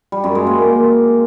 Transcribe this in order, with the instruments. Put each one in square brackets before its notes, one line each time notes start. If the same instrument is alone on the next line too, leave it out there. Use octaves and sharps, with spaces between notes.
[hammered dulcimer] G3
F#2
G#3
A#3